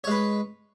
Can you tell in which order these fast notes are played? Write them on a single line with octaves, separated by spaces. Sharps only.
C#5 G#3 B4